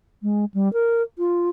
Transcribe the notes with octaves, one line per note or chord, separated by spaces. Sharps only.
G#3
G3
A#4
F4